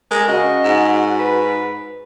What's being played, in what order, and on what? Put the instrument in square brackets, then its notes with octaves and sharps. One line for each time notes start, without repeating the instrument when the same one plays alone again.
[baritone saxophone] G#3 [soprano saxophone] A#4
[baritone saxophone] C#3 [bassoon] F#4 [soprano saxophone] D#5
[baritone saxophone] G#2
[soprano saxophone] B4